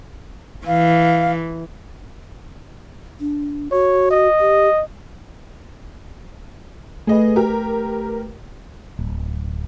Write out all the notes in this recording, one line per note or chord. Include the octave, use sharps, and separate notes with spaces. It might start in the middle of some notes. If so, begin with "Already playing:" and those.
E3 F5
D4
F#4 C#5
D#5
G4
A3 G#4 B4 D#5
G4 A#4
D1